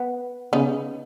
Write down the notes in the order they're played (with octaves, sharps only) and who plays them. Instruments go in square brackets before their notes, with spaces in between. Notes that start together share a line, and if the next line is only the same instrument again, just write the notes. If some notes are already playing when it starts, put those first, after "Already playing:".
Already playing: [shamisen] B3
[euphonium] C#3 [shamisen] B3 D#4